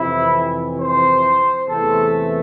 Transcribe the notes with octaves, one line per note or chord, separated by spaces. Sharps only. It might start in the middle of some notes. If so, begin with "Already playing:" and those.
Already playing: F2 C3 E3 E4
C5
E2 C3 E3 A3 A4